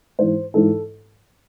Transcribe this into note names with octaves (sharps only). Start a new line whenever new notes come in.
G#2 E3 C5
G#2 E3 A4